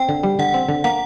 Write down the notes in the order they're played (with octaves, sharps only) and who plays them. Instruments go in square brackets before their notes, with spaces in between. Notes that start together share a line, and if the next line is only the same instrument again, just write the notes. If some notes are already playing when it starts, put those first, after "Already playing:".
Already playing: [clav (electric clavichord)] C4 [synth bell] G5
[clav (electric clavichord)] D3
G3
[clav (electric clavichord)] D3 [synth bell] F#5
[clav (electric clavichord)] C4
D3
[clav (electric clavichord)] A#3 [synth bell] F#5